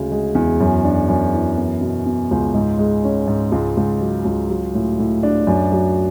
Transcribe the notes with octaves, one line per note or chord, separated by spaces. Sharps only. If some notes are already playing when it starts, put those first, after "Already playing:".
Already playing: D2 C#3 G#3
G#3
E2
F#2
D4
F#2
E3
B3
B2
B2
C#2
G#2
G#3
C#4
G#2
C#2
C#2
F#3
C#2
F#3
A2
A2
D4
F#2
F#3